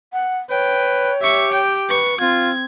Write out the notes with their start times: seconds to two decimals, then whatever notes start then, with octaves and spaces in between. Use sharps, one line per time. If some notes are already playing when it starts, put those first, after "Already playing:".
0.13 F#5
0.50 B4 C#5 G5
1.22 G4 E5 C#6
1.52 G5
1.89 B4 C#6
2.20 C4 F4 G#6